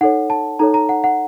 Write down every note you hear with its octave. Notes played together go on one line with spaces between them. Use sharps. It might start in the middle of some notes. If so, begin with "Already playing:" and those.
D#4 A4 C#5 F#5
A5
D#4 A4 C#5 A#5
A#5
F#5
F#5